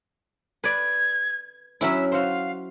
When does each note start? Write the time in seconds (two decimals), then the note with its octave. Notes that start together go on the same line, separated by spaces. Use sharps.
0.64 B4 D5 G#6
1.81 F#3 C#4 E4 E5
2.12 F#4 C5 F5